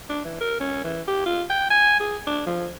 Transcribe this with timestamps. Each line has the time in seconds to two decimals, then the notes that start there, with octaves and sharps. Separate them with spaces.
0.10 D4
0.25 E3
0.41 A#4
0.60 C#4
0.84 E3
1.08 G4
1.26 F4
1.50 G5
1.70 G#5
2.00 G#4
2.27 D4
2.47 F3